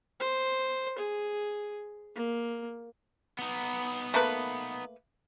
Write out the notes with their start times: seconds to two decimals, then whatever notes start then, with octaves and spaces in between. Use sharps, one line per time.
0.20 C5
0.99 G#4
2.15 A#3
3.39 B3 D#4
4.14 A3 A#3 B4